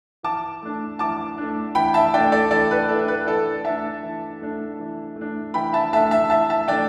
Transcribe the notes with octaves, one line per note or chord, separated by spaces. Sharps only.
E3 A5 D6
A3 D4
E3 A5 D6
A3 D4
E3 G5 B5
E5 A5
A3 D4 D5 G5
A4 D5
E3 A4 D5
B4
A3 D4 A4
B4
E3 A4 D5
A3 D4 E5 A5
E3
A3 D4
E3
A3
D4
E3 G5 B5
E5 A5
A3 D4 E5 A5
E5 A5
E3 E5 A5
E5 A5
A3 D4 D5 G5